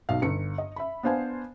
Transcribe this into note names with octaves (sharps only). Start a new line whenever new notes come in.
B1 B2 F5
G1 C#7
D#5
E5 B5
B3 D4 C5 F5 G#5